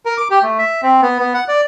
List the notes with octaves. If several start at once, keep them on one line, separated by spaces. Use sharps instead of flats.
A#4
D6
G4
A3
E5
C4
B3
B3
F#5
D5